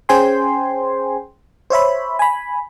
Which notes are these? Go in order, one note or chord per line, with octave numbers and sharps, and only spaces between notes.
C#4 G#4 C5 G5 G#5 C6
C5 C#5 E5 B5
G#5 B5